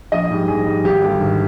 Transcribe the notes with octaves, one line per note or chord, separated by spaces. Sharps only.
A#1 D#5
G#2 G3
A#1 G#4
G#2 G3
G#1 G4
G2 D3 G3
G#1